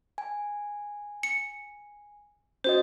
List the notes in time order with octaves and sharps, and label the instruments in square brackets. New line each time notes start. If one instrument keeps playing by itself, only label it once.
[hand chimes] G#5
[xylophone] C#7
[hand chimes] C#4 F#4 D#5 [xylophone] C5